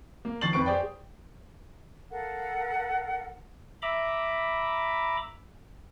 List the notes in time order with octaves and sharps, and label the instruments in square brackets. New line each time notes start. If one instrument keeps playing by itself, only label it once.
[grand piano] A#3
D#3 F3 C#6 A6 C7 F#7
F2 B4 C#6 D7
G4 G#4 C5 D5 G5
[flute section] A4 A#4 F5 F#5
[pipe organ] E5 A#5 B5 D6